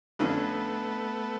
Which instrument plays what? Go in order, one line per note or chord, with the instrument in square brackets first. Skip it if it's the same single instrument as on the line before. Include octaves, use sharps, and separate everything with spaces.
[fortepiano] F2 D3 C#4 [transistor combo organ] A3 B3